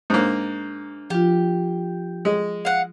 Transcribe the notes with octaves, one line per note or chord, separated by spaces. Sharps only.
G#2 A#3 D4
F3 F4 G4
G#3
F5 F#5